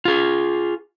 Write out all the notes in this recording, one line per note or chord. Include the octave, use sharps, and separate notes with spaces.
F4 G#4